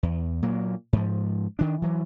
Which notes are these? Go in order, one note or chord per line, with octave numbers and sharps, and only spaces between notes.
E2
A#2 F#3 A#3
G#2 F3
D#3 D4
E3 F#3